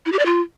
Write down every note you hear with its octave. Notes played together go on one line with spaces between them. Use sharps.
E4
G4
D5
F4